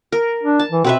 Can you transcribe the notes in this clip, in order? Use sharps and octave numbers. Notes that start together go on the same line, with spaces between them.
A#4
D4
A5
E3
B2 C4 B4 E5